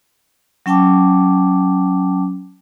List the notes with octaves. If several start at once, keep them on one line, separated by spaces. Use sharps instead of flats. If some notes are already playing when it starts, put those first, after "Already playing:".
F#3 C#4 G5 A5 D6